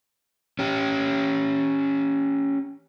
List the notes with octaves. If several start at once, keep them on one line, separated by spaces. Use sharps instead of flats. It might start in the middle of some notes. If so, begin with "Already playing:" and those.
C#4 G4